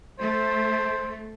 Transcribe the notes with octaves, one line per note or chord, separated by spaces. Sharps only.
A3 C5